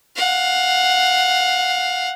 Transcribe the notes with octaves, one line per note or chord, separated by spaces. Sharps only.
F5 F#5